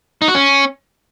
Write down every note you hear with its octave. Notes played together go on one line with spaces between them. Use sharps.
D#4
F#4
C#4